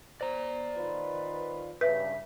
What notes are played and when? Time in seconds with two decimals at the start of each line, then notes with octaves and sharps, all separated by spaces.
0.21 C5 D5 A#5
0.75 D#3 F4 B4
1.81 G2 C#3 B4 E5 B6